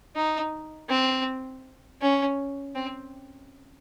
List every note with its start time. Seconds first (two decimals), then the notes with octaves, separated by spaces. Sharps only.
0.16 D#4
0.89 C4
2.02 C#4
2.75 C4